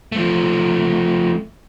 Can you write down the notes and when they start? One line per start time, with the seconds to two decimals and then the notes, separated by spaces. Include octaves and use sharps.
0.12 F3 A3